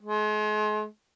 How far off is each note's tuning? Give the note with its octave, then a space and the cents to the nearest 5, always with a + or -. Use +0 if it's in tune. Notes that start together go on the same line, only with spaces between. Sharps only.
G#3 +40